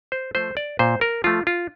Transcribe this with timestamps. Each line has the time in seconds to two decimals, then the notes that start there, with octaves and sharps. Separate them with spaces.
0.12 C5
0.35 F3 A3 C5
0.57 D5
0.79 A#2 C5
1.01 A#4
1.24 F3 A3 F4
1.47 F4